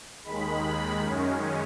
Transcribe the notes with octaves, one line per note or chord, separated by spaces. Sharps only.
D#2 D#3 G#3 B5
F#2 D#3 G#3 C#4